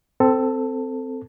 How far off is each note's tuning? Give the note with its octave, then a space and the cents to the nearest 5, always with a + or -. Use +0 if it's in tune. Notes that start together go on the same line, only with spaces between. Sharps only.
C4 -10 A4 +10